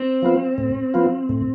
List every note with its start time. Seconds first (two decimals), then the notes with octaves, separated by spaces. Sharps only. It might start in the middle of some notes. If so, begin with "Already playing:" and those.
Already playing: C4
0.23 F3 B3 F4
0.58 A2
0.94 F3 B3 F4
1.29 A2